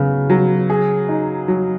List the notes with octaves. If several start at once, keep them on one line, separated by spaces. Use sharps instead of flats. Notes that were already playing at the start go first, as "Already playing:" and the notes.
Already playing: C#3 F#3 B3
F#3
G#4
D#4
F#3